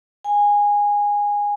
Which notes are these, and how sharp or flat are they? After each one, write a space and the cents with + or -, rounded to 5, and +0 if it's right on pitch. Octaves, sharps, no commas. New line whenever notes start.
G#5 -15